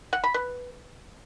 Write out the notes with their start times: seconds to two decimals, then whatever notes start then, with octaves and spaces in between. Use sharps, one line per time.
0.13 F#5
0.24 B5
0.34 B4